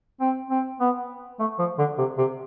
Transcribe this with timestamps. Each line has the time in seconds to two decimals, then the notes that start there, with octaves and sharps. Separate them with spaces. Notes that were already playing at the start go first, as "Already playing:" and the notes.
0.21 C4
0.50 C4
0.80 B3
1.40 A3
1.59 F3
1.79 D3
1.98 C3
2.18 C3